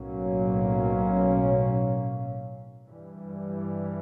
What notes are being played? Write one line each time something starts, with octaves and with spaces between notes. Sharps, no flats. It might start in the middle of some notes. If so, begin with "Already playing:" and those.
Already playing: B1 A2 F#3 A#3 C#4
G2 E3 G3